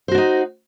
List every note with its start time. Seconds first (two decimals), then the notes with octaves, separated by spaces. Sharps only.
0.08 C5
0.11 F#4
0.15 D4
0.18 D#4